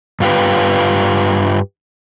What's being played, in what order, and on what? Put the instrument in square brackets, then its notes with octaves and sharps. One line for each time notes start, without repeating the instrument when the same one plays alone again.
[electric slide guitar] G2 F4 G4 B4